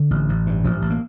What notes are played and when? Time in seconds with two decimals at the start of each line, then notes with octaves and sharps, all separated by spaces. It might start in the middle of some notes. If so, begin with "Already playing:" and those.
Already playing: D3
0.11 A1
0.29 A1
0.46 G2
0.64 A1 F3
0.82 A1
0.90 A#3